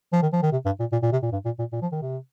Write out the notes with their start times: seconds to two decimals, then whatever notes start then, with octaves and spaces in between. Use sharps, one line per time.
0.12 F3
0.22 D#3
0.33 F3
0.42 D#3
0.52 C3
0.65 G2
0.80 A#2
0.92 A#2
1.03 A#2
1.12 C3
1.22 A#2
1.32 G2
1.45 A#2
1.59 A#2
1.72 A#2
1.82 F3
1.92 D#3
2.02 C3